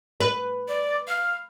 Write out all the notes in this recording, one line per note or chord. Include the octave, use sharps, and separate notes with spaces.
B4
D5
F5